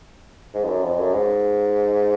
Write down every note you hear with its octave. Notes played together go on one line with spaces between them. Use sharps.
G#2
F2
F#2
F2
F#2
G#2